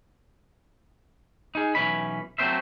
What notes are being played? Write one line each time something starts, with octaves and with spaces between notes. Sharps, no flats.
D#4 G#4
B1 E3 C#4 B5
F#3 A3 C4 C#4 C5 E5